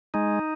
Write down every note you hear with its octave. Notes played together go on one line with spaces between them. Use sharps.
G#3 D#4